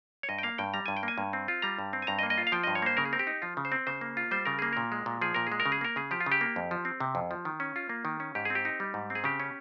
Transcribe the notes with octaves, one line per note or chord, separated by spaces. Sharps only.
C#5
G2 D#5
G5
A#3 F5
G2 G5
G3 A#5
G2 G#5
G5
A#3 G#5
G2
C4
F4
G3 A#5
G2
C4
G#5
G2 A#5
D#5
A#3
D#5
F4
F5
F3 G5
G2 D#5
C#5
A#3 C5
C#3 A#4
G#4
C4 A#4
G4
D#4
F3 F4
C#3
C5
C4
C#3 C5
A#3
F4
G3 C5
C#3 A#4
A#3 G#4
A#2 A#4
G#3
A#2
F3 G#4
A#2 A#4
G#3 G#4
A#4
C#3
G#4
A#3 A#4
C#3 G#4
F3 G4
F4
C#3
G4
A#3
F2
F3
C4
C3
F2
F3
D#3
C#4
F4
A#3
D#3
C#4
G#2 G4
C4 G#4
G4
D#4
G3
G#2
C4
G#4
C#3 G4
C#4